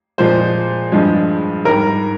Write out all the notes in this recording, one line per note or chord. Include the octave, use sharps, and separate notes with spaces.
A#2 F3 G#3 C5
G2 F3 G#3
G#2 G3 A#4